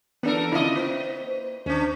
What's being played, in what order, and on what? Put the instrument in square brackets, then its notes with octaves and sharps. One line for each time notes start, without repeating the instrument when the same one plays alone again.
[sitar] E3 A4 A#4 [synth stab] B3 D4
[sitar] C#3 D5 D#5 [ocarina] C4 [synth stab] E4 F4
[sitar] A#3 [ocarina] C5
[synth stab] D#2 [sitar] C#4 D4